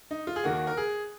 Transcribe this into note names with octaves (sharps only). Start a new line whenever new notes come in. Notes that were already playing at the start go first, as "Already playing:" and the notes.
D#4
F4
G#4
D#2 D#3 A#3 F#4
A#4
G#4